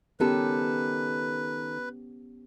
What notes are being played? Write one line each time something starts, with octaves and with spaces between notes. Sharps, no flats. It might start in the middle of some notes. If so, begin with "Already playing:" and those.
D#3 B3 C#4 G4 A4 B4